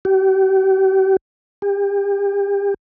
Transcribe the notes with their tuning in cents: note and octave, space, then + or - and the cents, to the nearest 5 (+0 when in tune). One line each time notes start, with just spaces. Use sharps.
G4 -40
G4 +35